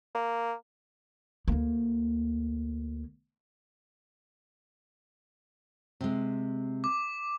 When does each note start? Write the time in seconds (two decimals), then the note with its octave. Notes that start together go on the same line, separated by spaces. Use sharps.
0.15 A#3
1.48 D2 A#3
6.01 C3 G#3
6.84 D6